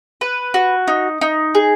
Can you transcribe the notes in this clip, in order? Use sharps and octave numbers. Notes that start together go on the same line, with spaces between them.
B4
F#4
D#4
D#4
G#4